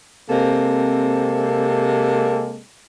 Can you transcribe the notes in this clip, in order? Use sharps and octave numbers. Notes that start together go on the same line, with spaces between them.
C3 G#3 A#3 C4 A4